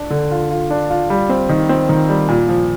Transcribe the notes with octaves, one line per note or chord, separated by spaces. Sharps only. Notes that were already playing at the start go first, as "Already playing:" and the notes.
Already playing: D4
D3
F4
F4
D4
F4
G3
C4
D#3
C4
D#3
G3
A#2
F3